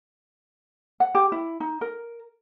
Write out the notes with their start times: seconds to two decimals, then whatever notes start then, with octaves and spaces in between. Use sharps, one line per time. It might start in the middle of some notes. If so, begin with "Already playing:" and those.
1.00 F#5
1.15 G4
1.32 E4
1.60 D#4
1.81 A#4